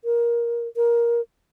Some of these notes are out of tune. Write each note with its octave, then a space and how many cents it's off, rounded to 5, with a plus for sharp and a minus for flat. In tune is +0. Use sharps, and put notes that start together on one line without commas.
A#4 +15
A#4 +15